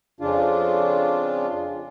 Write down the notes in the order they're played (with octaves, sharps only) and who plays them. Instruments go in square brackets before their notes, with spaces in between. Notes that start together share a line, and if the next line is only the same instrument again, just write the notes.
[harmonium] F2 C#3 D4 F4